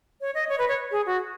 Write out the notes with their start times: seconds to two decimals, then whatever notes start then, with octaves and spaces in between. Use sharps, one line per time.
0.21 C#5
0.35 D#5
0.49 C#5
0.58 B4
0.68 C#5
0.91 G#4
1.06 F#4